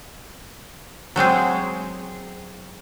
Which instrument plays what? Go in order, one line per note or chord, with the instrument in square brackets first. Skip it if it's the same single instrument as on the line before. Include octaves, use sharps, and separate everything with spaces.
[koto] F#3 G#3 C4 G#4